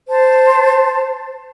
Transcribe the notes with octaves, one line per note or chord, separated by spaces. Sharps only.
C5 A5